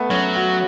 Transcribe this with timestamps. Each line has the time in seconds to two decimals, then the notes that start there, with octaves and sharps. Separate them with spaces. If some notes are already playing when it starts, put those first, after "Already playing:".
Already playing: A3 B3
0.10 F#3 C#4
0.36 F#4